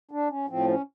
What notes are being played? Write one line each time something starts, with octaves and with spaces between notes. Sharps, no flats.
D4
C#4
A2 F3 C4
C#4